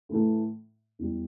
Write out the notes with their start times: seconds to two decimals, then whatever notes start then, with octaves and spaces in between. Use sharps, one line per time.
0.09 A2 E3 A3
0.99 E2 E3 G3